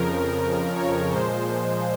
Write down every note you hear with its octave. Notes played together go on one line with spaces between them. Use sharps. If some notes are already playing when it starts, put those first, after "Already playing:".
Already playing: F2 C#3 F3 A#4
C#5
A#2 F3 G#3 C5